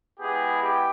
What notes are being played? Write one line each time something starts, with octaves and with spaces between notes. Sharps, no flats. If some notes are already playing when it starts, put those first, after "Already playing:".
G#3 B3 E4 G4 G#4
G4